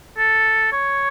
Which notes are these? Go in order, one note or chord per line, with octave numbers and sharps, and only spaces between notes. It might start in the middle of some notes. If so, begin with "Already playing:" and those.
A4
C#5